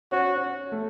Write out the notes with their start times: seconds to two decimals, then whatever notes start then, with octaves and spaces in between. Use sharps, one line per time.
0.12 C#4 F#4
0.36 C#4
0.72 A3